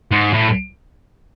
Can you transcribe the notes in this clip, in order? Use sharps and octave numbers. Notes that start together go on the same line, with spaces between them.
G#2
A2